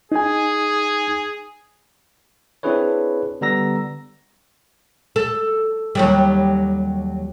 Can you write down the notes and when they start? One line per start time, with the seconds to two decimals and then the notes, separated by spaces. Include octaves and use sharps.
0.12 D#4 G#4 G#5
2.63 C4 D4 E4 G#4 B4 C#5
3.41 D3 G3 B3 A#5 E6 A#6
5.16 A4
5.95 D#2 F#3 G3